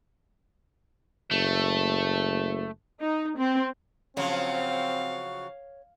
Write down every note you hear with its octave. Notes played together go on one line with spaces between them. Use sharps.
F#1 A3
D#4
C4
C#3 F3 F#3 C4 C#5 F5